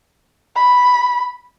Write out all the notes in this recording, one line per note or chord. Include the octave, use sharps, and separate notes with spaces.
B5